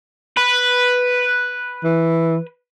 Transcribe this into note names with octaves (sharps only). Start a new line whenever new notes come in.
B4
E3